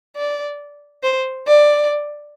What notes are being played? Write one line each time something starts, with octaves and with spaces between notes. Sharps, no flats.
D5
C5
D5